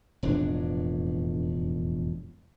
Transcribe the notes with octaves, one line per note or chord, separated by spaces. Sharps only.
E1 F2 A2 D4